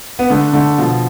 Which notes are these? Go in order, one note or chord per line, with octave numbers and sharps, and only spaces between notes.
B3
D3 A3
D3 A3
B2 F3